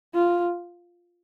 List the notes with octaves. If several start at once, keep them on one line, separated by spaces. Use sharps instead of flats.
F4